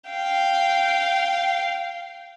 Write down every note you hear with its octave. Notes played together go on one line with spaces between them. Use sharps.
F5 G5